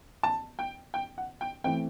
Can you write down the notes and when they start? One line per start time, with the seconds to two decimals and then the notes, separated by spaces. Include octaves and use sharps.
0.23 A5
0.59 G5
0.94 G5
1.18 F#5
1.41 G5
1.64 E3 A3 C4 G5